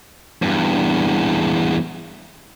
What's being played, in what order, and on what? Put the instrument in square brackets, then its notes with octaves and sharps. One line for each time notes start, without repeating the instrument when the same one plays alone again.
[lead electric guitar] E2 G2